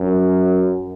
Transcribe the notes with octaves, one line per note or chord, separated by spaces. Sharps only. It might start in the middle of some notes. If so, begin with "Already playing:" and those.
Already playing: F#2